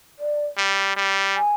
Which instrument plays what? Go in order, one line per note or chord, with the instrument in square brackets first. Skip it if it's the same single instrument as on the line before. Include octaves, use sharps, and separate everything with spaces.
[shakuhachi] D5
[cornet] G3
G3
[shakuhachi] G#5